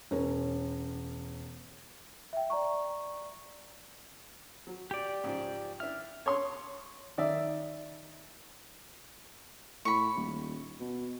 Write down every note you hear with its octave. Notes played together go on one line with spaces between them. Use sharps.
E1 C#4 A#4
E5 G5
D5 A#5 C#6
F#3
G4 D5
G#2 C#3 F3
D4 E4 E5 F6
C#5 C6
D#3 D5 E5
A2 B5 C#6
D#1
B2